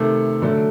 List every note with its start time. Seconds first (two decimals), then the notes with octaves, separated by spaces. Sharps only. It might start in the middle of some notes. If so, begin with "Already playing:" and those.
Already playing: C3 D#3 A3 A4
0.42 D3 F#3 A3